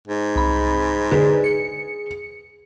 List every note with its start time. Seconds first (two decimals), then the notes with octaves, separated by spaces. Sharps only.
0.08 G#2
0.36 C2 B5
1.12 D3 G#4 B4
1.44 C#7